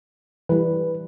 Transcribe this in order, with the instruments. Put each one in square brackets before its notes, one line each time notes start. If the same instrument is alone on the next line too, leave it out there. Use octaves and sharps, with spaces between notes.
[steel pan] E3 G3 [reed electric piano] B4